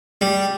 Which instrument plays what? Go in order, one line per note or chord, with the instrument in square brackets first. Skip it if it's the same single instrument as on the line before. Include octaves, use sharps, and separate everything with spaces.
[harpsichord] G3